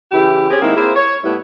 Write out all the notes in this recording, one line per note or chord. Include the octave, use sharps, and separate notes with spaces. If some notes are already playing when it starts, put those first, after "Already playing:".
C#3 E3 E4 G4
C4 C#4 G4 G#4
D#3 G#3 A#3 C4 E4
A#3 C4 E4 G#4 C5
C#5
A2 G3 B3 E4